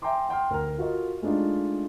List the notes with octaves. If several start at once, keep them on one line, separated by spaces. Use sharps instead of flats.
E5 G5 G#5 A#5 C6 D6
F#5 G5 C6 F6
D2 A#4 A#5 F6
F4 F#4 A4 A#4 D#5
G#3 A3 D4 D#4 F4